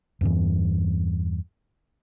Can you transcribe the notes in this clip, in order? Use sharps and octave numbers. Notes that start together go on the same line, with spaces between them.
E2 G2 E3